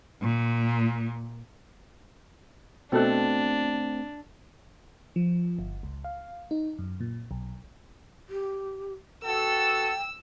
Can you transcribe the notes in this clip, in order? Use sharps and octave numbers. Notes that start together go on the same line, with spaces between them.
A#2
B2 A3 C4 D4 A4 F#6
F3
G1
C#2
F5
D#4
F#2
A#2
B1
G4
B3 F#4 A4 G5 E6